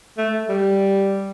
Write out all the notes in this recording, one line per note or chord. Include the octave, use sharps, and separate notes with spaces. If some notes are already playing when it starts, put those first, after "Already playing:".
A3
G3